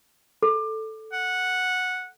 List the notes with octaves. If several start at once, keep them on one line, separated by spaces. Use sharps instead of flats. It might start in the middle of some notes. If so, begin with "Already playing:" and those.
A4
F#5